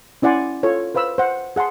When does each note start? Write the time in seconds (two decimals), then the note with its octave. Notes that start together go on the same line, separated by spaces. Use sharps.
0.22 C#4 E4 D5 F#5 G#5 C6
0.63 F4 A4 C#5
0.95 B4 C5 F5 B5 E6
1.18 C5 F#5
1.56 G#4 F#5 A5 C6